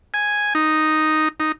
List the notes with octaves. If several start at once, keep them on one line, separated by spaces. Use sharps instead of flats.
G#5
D#4
D#4